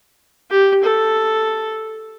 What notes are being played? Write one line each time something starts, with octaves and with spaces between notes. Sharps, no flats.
G4
A4